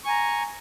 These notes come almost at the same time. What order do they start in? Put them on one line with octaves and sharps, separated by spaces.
C#6 G#5 A#5